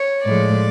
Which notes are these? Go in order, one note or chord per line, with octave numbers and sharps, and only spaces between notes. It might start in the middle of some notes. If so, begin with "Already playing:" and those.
Already playing: C#5
A2 F3 G#3 D5